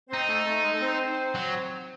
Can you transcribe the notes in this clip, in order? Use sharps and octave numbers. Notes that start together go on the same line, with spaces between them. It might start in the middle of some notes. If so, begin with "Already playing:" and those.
C4 D#4 C5
A3 A4
A3 A4
G#3 G#4
A4
C4 C5
F#3